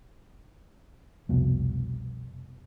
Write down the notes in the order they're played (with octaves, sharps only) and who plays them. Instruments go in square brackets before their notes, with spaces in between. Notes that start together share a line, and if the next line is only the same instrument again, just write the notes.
[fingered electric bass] F1 C2 B2